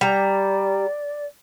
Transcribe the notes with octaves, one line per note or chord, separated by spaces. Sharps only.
G3 D5 A#5